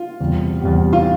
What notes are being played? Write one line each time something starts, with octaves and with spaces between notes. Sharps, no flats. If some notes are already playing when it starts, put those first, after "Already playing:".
Already playing: F4
E2 C3 G3
E2 C3 G3
F4